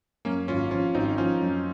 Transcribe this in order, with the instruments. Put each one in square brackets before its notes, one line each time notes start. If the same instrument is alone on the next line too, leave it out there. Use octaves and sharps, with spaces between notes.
[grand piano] F#2 [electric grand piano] A#3 C#4
[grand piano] G#1 [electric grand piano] C#4 F4
[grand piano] F3 [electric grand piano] C#4 F4
[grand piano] G#1 [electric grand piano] C4 D#4
[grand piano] F3 [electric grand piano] C#4 F4
[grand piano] F#2